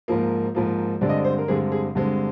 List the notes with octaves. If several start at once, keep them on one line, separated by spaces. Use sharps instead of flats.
G#2 F3 A#3
G#2 F3 A#3
G2 D3 G#3 C4 D5
D#5
D5
C5
A#4
G2 D3 G#3 C4 G#4
G#4
G2 D3 G#3 C4